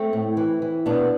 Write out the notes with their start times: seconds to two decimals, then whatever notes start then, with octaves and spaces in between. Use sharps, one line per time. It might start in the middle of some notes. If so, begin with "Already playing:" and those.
Already playing: A3 C4
0.13 A2
0.37 E3
0.62 E3
0.86 B2 B3 D4